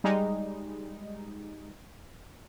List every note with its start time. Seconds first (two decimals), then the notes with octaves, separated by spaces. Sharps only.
0.04 G3 G#3 D#4